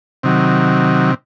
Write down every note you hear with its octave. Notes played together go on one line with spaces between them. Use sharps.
C3 D#3 F#3